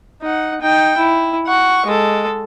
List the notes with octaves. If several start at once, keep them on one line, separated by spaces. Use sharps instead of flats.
D#4 F#5
D#4 G5
E4
F#5 C#6
G#3 A4